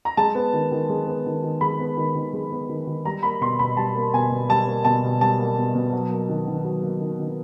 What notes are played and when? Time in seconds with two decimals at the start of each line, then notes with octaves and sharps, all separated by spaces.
0.05 A#5
0.17 G#3 A5
0.35 B3
0.53 D#3
0.72 D#3
0.89 G#3
1.07 B3
1.26 D#3
1.43 D#3
1.61 G#3 B5
1.79 B3
1.97 D#3
2.15 D#3
2.33 G#3
2.52 B3
2.69 D#3
2.87 D#3
3.05 G3 A#5
3.23 A#3 B5
3.41 B2 C6
3.59 B2 B5
3.77 G3 A5
3.95 A#3
4.14 B2 G#5
4.31 B2
4.49 G3 A5
4.67 A#3
4.85 B2 A5
5.03 B2
5.21 G3 A5
5.38 A#3
5.58 B2
5.74 B2
5.93 F#3
6.11 A#3
6.29 D#3
6.47 D#3
6.65 F#3
6.83 A#3
7.01 D#3
7.19 D#3